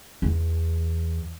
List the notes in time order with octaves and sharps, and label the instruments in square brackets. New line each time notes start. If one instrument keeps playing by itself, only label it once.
[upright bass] E2